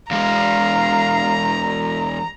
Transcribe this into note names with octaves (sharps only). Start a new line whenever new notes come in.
E2 G#3 F5 A#5